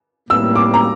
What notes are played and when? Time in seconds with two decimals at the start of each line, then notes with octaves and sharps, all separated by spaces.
0.30 A2 G3 A#3 E6
0.55 D6
0.74 A#5